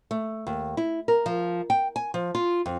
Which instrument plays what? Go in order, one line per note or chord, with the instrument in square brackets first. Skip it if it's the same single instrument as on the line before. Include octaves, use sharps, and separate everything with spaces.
[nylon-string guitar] A3
D#2
E4
A#4
F3
G5
G#5
F3
F4
F2